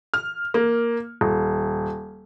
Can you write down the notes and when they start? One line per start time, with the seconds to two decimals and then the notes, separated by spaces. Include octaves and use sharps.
0.14 F6
0.54 A#3
1.21 D#1